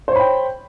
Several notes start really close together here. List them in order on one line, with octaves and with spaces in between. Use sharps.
C5 C#5 B5 G5